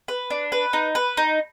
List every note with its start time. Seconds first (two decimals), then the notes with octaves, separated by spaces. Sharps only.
0.08 B4
0.30 D4
0.52 B4
0.73 D#4
0.95 B4
1.17 D#4